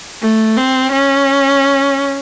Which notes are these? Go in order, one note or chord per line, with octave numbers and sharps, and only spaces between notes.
A3
C4
C#4